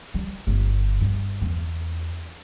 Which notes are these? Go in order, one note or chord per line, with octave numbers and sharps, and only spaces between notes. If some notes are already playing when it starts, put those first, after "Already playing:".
G3
G1
G2
E2